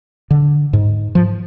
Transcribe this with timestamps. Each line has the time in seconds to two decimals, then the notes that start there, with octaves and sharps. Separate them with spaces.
0.31 D3
0.73 G#2
1.15 F3